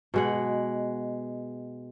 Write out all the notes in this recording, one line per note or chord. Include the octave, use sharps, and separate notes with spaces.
B2 G#3 F#5